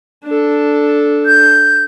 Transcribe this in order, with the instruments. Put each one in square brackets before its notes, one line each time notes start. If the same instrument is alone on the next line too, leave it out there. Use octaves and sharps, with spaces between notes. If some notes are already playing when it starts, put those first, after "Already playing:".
[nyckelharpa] D4 A4
[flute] G6